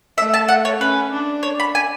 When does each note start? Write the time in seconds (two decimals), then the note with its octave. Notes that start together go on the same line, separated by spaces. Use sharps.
0.18 A3 E5
0.34 A5
0.48 F#5
0.65 C#5
0.80 C#4 B4
1.12 D4
1.43 C#5
1.60 B5
1.75 G#5